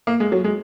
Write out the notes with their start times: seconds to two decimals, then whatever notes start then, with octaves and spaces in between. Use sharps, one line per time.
0.07 A#3
0.20 G#3
0.32 F#3
0.44 G#3